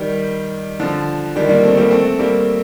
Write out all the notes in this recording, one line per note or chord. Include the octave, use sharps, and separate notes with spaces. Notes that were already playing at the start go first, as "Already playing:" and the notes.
Already playing: D#3 G3
D3 F3
D#3 G3
G3 A#3
A3 C4
G3 A#3
A3 C4
G3 A#3